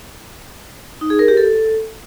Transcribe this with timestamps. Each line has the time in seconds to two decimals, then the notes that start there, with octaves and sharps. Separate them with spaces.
1.01 D#4
1.10 G#4
1.19 A#4
1.28 G4
1.37 A4